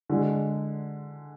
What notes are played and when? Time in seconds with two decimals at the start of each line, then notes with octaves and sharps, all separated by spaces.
0.10 D3 G#3 D4